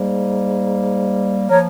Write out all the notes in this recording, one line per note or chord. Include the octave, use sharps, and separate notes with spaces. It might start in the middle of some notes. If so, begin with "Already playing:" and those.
Already playing: G#2 G3 A#3
F3 A#3 A#4 C#5